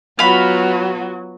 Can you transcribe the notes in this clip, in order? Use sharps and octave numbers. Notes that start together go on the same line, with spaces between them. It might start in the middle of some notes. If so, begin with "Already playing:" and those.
F#3 B3 F4 F#4 F5 B5